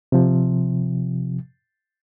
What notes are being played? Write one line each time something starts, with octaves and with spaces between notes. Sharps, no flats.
C3 F3